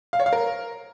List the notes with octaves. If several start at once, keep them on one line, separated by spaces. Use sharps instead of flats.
F5
C#5
F5
A#4